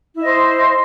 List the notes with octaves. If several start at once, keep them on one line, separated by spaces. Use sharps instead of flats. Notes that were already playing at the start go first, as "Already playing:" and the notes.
E4 C5 D#5